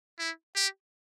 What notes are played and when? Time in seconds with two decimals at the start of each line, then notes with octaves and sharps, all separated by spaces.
0.19 E4
0.56 G4